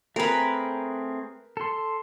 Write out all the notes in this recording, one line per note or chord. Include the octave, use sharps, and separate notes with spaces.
A3 C4 G#4 A#4 B4
A4 C6